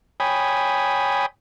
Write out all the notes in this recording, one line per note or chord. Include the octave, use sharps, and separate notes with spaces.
C#5 G5 G#5 B5 D#6